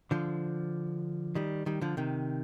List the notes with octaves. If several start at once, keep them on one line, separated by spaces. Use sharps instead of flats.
D3 F3
D#3 G3
D#3 G3
D3 F3
C3 D#3